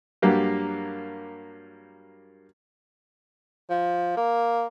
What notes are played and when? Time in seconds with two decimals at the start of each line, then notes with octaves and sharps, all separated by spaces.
0.22 G2 F#3 A#3 G4
3.70 F3
4.17 A#3